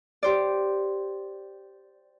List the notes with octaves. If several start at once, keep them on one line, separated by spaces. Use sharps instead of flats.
G4 C5 D5